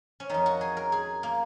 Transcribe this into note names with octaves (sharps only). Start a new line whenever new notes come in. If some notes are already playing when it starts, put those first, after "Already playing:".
C#4
F2 D#3 D#4
F#4
G#4
A#4
G#4
A#3